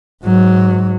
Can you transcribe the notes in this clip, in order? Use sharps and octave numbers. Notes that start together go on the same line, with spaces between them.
G#2 F#3